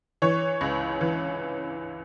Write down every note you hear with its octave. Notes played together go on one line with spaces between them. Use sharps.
E3 C#5
C#2
E3